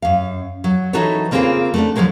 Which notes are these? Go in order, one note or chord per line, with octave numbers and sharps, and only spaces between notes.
F#2 F5
F#3
E3 D#4 F#4 A4 B4 C#5
C#3 A#3 C4 F4 G#4 B4
A3 B3 D4
D3 F3 F#3 G#3 A#3